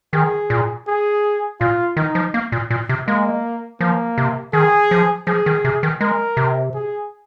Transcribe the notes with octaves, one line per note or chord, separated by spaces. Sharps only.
D#3 G#4
A#2
G#4
A#2 F4
D#3 D#4
F3
A#3
A#2
A#2
C3
G#3 A#3
F3 A#3
C3
D#3 G#4
F3
F3 G#4
D#3
C3
D#3
G#3 A#4
C3
G#4